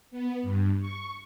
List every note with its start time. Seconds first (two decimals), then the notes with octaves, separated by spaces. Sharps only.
0.11 B3
0.43 G2
0.80 C#6